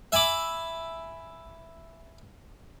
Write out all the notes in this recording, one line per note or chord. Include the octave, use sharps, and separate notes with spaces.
E5 G#5 B5 D6